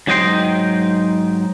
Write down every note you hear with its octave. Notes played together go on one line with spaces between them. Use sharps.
G#2 F#3 D#4 D#5 G5 C6